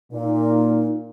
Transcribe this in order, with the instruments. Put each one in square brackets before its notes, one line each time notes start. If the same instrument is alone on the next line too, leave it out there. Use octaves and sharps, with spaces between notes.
[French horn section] A#2 [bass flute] D#4